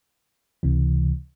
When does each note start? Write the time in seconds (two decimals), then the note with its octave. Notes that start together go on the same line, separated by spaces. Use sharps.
0.63 C#2 C3 E3